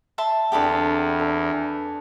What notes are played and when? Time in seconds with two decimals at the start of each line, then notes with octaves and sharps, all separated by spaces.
0.18 E5 A5 C6
0.52 E2 D3 C4 G4 G#4 A5 B5
1.19 D4 A4 B4